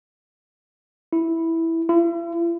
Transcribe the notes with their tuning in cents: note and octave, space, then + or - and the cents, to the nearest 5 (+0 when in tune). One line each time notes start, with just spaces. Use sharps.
E4 -5
E4 +45